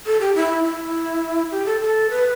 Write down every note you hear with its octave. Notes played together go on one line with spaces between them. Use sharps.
A4
G4
E4
E4
G4
A4
A4
B4